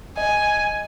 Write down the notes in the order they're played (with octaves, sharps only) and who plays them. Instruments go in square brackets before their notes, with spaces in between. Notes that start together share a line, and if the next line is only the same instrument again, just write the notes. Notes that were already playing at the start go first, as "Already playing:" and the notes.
[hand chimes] D#5 [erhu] G#5